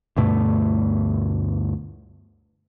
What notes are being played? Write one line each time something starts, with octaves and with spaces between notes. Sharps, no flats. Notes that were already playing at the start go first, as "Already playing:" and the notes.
D2 G2 B2 A3